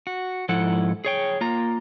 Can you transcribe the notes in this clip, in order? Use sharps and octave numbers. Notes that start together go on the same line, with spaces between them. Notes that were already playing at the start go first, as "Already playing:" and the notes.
F#4
G#2 F3 E4 A4 F#5
G#4 C#5 G5
A#3 F4 A#5